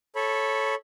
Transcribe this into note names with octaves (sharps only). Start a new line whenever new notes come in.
A4 C#5 B5